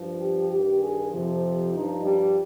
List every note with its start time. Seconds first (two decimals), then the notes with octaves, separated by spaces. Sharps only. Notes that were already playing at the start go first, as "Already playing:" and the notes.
Already playing: G2 F3
0.20 G4
0.50 G2 D#3 G4
0.81 G#4
1.12 F2 C3 F3
1.43 G4
1.73 G2 F3 D#4
2.04 G3